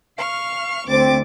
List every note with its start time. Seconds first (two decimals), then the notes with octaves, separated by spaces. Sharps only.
0.17 F5 C#6 F6
0.88 D2 C4 D6 A6